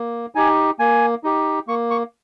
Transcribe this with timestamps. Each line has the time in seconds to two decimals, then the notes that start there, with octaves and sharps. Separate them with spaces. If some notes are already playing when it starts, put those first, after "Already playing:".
Already playing: A#3
0.35 D#4 G4 G#5
0.79 A#3 G#5
1.24 D#4 G4
1.68 A#3 C#6
1.91 C#6